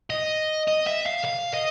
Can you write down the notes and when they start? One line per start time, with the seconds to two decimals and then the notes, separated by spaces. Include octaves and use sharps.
0.10 D#5
0.68 D#5
0.87 E5
1.06 F5
1.25 F5
1.53 D#5